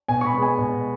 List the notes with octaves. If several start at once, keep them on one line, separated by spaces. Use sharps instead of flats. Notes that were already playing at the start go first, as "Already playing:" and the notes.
B2 G#5
C#6
B5
G#3 B3
G#5
B2